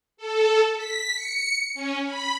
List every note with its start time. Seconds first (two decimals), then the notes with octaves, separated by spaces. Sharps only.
0.17 A4
0.76 B6
1.14 C#7
1.74 C#4
2.05 B5